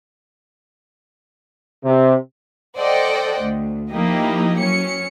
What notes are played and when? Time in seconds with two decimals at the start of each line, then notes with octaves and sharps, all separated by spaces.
1.84 C3
2.77 A4 C5 D5 D#5 F#5 G5
3.41 D2
3.92 F3 A#3 D#4 E4 G4 D#5
4.59 F#3 C#4 C#7